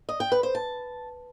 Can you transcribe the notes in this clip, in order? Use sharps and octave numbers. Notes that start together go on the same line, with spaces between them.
D#5
G5
B4
C5
A5